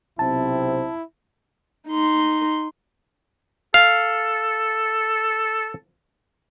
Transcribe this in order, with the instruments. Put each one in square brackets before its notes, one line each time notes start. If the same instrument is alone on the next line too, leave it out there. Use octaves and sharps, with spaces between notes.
[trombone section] B1 C3 C4 [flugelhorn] E4 [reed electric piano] A5
[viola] D#4 C6
[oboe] A4 [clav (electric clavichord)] F5